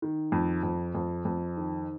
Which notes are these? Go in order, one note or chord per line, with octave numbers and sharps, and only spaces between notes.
D#3
F2
F2
F2
F2
D#3